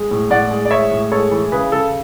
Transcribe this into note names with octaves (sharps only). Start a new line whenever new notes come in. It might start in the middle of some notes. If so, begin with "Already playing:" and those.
Already playing: G#3
A2
A2 D5 F#5
G#3
D5
G#3 C#5 E5
A2
G#3 A4 C#5
E3
C#3 G#4 B4
C#3 A4